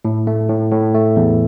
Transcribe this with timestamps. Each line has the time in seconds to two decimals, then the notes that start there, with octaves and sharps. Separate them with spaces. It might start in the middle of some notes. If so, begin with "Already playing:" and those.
0.05 A2
0.27 A3
0.49 A2
0.72 A2
0.94 A3
1.16 E2